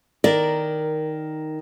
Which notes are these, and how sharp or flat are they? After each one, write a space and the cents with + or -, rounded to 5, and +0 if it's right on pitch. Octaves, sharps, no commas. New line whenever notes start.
D#3 +0 A#4 +0 D5 +0